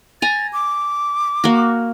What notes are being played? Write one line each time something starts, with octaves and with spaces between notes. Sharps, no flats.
G#5 A#5 A6
D6
A#3 F#4